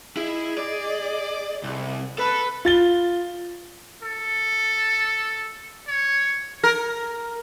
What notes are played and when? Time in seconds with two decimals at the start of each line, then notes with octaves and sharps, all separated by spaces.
0.17 E4 G#4 D#5
0.58 D5
1.63 C2
2.18 A4 B4
2.65 F4 A6 G7
4.03 A4
5.87 C#5
6.64 A#4